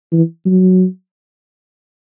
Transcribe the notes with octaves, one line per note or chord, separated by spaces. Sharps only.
E3
F#3